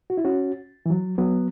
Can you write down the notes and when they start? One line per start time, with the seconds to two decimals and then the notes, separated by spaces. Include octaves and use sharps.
0.10 F#4
0.17 E4
0.25 C#4 F#4
0.86 E3
0.90 F#3
1.18 F#3 B3